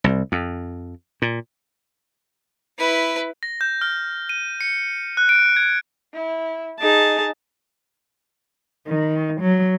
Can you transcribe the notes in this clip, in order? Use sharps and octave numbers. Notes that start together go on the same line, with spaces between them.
C2
F2
A#2
E4 B4
A#6
G6
F6
D#7
C#7
F#6
D7
G#6
E4
D#4 G#4 A5
D#3
F#3